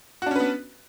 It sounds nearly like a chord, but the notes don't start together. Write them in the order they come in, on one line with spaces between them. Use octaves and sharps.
F#4 D4 C#4 B4 B3